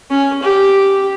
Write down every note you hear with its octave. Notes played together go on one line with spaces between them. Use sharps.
C#4
G4